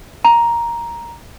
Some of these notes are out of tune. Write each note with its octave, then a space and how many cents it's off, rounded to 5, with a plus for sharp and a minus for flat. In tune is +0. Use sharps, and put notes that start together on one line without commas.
A#5 +5